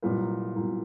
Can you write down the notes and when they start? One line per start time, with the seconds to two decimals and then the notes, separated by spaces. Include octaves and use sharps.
0.02 C2 A#2 F#3 B4
0.56 C2 A#2 F#3